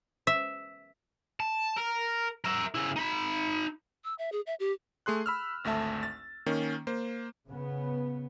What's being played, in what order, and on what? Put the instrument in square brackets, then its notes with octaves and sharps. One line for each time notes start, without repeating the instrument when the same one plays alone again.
[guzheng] E5
[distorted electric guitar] A5
A#4
A#4 E5
C#3 E4
D#4 B5
[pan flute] E6
E5
G#4
E5
G4
[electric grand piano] A3 G#4 C6 F#6
B5 E6 F6
G#1 D2 A3 E5 A5
A6
D#3 A#3 C#4
A#3 C5
[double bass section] C#3 B3